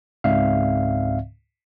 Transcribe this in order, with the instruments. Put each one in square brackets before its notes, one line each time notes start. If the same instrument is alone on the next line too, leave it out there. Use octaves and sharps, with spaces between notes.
[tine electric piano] C#2 G#2 C4 D5 E5 F5